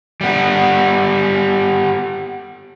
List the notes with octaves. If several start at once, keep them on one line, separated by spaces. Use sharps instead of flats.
G3 B3